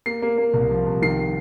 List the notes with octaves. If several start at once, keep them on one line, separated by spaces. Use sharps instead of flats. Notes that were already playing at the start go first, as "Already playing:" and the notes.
A#3 C7
A#3
A#3
C2
F3
C2
D#3 C7